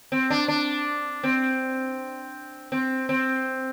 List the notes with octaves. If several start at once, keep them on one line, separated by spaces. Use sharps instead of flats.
C4
D4
D4
C4
C4
C4